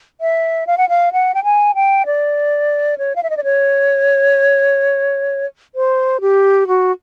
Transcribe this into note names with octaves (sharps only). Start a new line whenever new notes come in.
E5
F5
F#5
F5
F#5
G5
G#5
G5
D5
C#5
F5
E5
D#5
D5
C#5
C5
G4
F#4